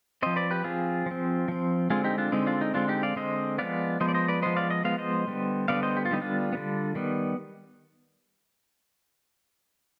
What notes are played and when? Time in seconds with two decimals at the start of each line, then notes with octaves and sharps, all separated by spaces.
0.22 F3 C4 C5 D#5
0.36 B4 D5
0.51 G4 B4
0.64 F3 C4 F4 G#4
1.06 F3 C4
1.48 F3 C4
1.90 D3 G#3 C4 F4 G#4
2.04 D#4 G4
2.18 D4 F4
2.32 D3 G#3 C4 D#4
2.46 D4 F4
2.61 D#4
2.74 D3 G#3 C4 D4 F4
2.88 D#4 G4
3.03 D5 F5
3.16 D3 G#3 C4 C5 D#5
3.58 F3 G#3 B3 D5 F5
4.00 F3 G#3 B3 C5 D#5
4.09 D5
4.14 C5 D#5
4.28 B4 D5
4.42 F3 G#3 B3 C5 D#5
4.56 D5 F5
4.70 D#5
4.84 F3 G#3 B3 F5
4.98 C5 D#5
5.27 D3 G3 B3
5.68 D3 G3 B3 D5 F5
5.83 C5 D#5
5.97 G4
6.05 F4
6.11 D3 G3 B3 D#4
6.21 D4 F4
6.53 D3 G3 B3
6.95 D#3 G3 B3